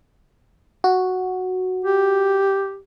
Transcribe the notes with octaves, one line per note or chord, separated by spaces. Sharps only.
F#4
G4